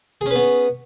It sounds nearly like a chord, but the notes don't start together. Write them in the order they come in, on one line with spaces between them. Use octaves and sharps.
G#4 C#4 B4 B3